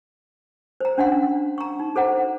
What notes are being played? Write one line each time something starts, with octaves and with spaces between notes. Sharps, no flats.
C5 A#5
C#4 D4 F5 F#5 C6
A#5 C#6
D#4
A4 C5 F#5 A#5